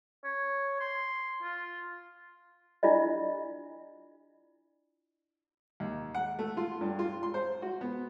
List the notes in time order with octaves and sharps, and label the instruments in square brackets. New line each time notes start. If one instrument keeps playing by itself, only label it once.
[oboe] C#5
C6
F4
[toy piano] D4 E4 F4 D5 D#5
[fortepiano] D#2
F#5
A3
F4
G2
F4
C6
C5
F#4
B3